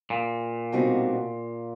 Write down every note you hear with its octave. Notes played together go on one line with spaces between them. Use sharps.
A#2
B2 G3 C4 D#4 F#4